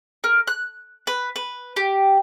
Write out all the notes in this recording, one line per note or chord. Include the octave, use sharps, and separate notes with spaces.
A#4
F#6
B4
B4
G4